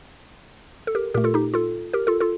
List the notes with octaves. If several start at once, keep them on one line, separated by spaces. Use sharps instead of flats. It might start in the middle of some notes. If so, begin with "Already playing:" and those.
A4
G4 A#4
A#2 A3 G4 A#4
F4 A4
D#4 G4
F4 A4
G4 A#4
F4 A4
F4 A4